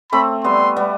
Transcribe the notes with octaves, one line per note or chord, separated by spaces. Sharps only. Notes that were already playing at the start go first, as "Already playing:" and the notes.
A3 C4 B5
G3 B3 C6
G3 B3